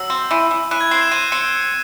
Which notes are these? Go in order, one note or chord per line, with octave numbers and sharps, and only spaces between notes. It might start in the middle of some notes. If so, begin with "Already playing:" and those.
Already playing: F#3 E6
C4
E3
E3
E3 F#6
G#6
C4 C7
E7
C4 D#7
C4 C#7